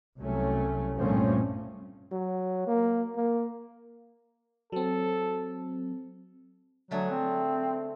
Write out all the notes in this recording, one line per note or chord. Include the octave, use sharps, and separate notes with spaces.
C2 F#3 G3 A3 C#4
G2 A#2 F3 A3 C4 C#4
F#3
A#3
A#3
F#3 C4 A4
D3 F#3 A3 G#4
C4